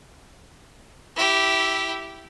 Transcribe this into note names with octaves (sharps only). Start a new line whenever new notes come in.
E4 G4